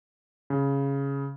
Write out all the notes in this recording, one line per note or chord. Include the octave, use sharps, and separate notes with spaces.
C#3